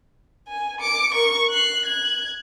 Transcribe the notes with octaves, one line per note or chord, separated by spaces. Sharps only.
G#5
D6 C#7
A#4 C#6
F#6 C7
F#6 G#6